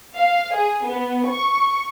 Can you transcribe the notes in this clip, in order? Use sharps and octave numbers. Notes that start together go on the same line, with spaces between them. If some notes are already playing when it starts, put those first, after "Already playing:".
F5
G#4
B3
C#6